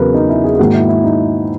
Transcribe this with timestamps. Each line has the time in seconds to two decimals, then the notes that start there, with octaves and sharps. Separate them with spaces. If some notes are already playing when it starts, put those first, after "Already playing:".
Already playing: E2 C#3 F#3 B3 A#4 B4
0.14 D#4
0.29 E4
0.44 G#4
0.54 G#4
0.59 G#2 D#3 A#3 F#4
0.74 E4
0.89 E4
1.04 D#4